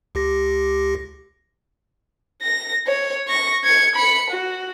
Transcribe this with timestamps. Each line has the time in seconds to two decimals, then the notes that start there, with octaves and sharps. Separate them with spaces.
0.15 C#2 G4 A#6
2.42 A#6
2.87 C#5
3.28 C#6 A#6
3.64 G#6 C#7
3.95 B5 C#7
4.30 F#4